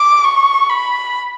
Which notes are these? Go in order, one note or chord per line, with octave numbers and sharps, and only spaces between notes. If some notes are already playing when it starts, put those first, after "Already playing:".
Already playing: D6
C#6
B5